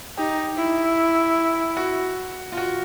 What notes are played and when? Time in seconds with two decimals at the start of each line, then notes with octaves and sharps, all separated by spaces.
0.17 D#4 G4
0.57 E4
1.77 F#4
2.52 F4
2.57 F#4